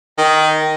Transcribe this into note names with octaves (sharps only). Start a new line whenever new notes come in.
D#3